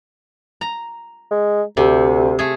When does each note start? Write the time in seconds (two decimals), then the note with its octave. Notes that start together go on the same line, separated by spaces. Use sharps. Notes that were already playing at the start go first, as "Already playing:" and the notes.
0.61 A#5
1.31 G#3
1.77 D2 C3
2.39 A3 G#4